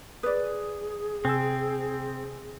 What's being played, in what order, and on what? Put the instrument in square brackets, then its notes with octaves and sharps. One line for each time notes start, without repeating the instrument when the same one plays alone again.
[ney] G#4 [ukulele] B4 D5 [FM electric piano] D#6
[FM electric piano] C3 G#5 E6 [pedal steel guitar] C4